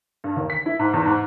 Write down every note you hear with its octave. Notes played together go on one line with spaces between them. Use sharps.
G2
D#2
B6
E4
G#2
E2
G#2